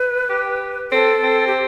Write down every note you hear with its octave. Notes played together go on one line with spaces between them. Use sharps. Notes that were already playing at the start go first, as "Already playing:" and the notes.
Already playing: B4
G4
C4 A4
C4
G4